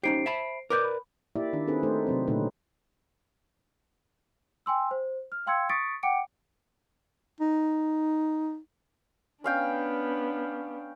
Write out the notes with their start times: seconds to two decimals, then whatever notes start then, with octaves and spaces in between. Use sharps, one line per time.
0.03 C#4 D#4 G4 C5 C7 D7
0.26 E5 A5 B5
0.70 A#4 B4 D5 D6 G6
0.84 B5
1.36 A#3 E4 G4 D5 E5
1.53 D#3 D4
1.67 C4 D4 D#4 G#4 A4 B4
1.83 A3 D#4 C5
2.07 C3 F#3 C4
2.27 A#2 D3 A3 C#4 D#4 B4
4.66 G5 G#5 C6 E6
4.91 C5
5.32 F6
5.46 F5 G5 C6 E6 G#6 C#7
5.69 C#6 D#6 A6 B6 C#7 D7
6.03 F#5 G5 D6 C#7 D7
7.41 D#4
9.44 B3 C#4 D4 F5 G5